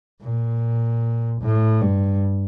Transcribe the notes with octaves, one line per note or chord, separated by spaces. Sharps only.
A#2
A2
G2